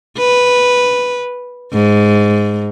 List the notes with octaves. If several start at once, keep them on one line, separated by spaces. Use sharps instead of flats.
B4
G#2